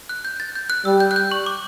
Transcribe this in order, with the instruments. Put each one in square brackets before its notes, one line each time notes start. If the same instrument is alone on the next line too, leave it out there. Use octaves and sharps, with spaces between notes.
[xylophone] F#6
G6
A6
G6
F#6
[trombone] G3 [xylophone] E6
[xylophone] G6
F#6
G6
C#6
D6